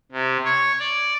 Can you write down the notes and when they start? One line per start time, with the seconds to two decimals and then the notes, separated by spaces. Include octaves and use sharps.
0.12 C3
0.44 C#5
0.80 D5